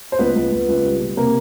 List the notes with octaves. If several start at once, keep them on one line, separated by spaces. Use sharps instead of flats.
C5
C#2 B3 B4
C#2
C#2
C#2
G3
B2
C3 A#3 A#4